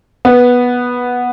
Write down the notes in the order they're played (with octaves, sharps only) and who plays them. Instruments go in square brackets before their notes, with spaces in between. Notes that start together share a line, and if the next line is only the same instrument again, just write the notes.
[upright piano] B3